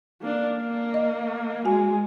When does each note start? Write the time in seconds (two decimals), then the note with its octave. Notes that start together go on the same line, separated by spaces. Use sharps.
0.21 A#3 D4
0.58 A#3
0.94 D#5
1.65 G#3 F#4 G#5